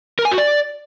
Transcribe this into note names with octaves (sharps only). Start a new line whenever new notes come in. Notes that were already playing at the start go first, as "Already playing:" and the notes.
A#4
G#5
F#4
D5